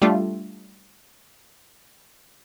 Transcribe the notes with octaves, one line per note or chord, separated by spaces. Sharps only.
G3 A3 D4 F4